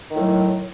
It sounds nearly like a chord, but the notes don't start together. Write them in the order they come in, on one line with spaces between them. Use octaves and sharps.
D#3 A2 F#3